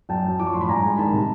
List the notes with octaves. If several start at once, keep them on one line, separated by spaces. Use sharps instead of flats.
F#2 G5 A5
F#3
F3 D6
C#6
A2 C6
B5
G2 G#5 A#5
G#3
D#3 A5 B5
C3